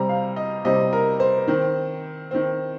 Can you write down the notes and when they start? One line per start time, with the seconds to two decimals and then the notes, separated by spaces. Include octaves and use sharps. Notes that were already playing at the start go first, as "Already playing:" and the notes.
Already playing: C3 G3 C4 A#5
0.09 F5
0.36 D#5
0.65 C3 G3 C4 D#5
0.93 A#4
1.20 C5
1.48 D#3 C4
2.31 D#3 C4